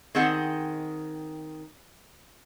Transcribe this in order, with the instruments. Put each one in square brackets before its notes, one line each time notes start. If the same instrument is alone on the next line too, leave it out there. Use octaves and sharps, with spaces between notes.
[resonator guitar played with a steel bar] D#3 C4 G#4 D#5 F#5